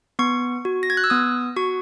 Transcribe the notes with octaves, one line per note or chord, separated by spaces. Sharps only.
B3 C#6
F#4
A#6
G#6
F#6
E6
B3 D#6
F#4 C#6